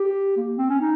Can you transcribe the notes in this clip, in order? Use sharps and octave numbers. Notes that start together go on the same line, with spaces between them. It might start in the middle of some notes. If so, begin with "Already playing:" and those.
Already playing: G4
A#3
C4
C#4
D#4